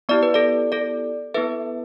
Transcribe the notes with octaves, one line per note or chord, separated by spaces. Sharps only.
B3 E4 G4 D5
B4
A4 D5
A4 D5
B3 E4 A4 B4 E5